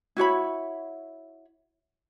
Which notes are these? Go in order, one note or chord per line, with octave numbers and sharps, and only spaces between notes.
E4 F#4 C#5 B5